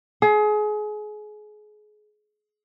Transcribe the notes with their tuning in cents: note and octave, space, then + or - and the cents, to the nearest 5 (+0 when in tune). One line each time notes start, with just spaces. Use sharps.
G#4 +30